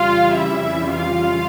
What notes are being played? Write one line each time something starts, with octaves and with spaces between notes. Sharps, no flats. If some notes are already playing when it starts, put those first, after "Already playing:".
Already playing: F2 C#3 E3 G3 F4 F5
E4 E5
F4 F5